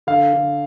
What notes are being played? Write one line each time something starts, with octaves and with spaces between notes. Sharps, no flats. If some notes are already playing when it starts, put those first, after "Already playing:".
D3 F5
D3